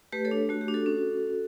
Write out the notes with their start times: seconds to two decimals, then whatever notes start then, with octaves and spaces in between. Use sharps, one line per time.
0.12 A3 G4 B4
0.25 A4 C#5
0.31 D4
0.49 A3 F#4
0.61 G4
0.68 D4
0.74 F#4 A4
0.86 C#4